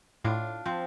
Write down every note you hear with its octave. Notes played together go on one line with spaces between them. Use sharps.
A2 D4 F4
F3 C4